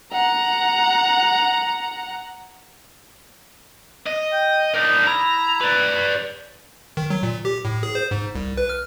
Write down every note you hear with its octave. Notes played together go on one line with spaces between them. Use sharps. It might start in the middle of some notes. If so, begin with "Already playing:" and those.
F#5 A#5
D#5
G5
D4 D#4 A#4
E4 A#5
B4 D5
D#3
F#3
A#2
G4
A2
G#4
C5
G#2
C2
B4
F6